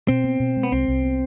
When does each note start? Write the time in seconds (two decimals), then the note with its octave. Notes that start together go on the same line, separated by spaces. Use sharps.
0.08 B2 C4
0.24 B3
0.40 B2
0.57 G#3
0.63 B3
0.72 C2 C4
0.88 C2
1.03 B3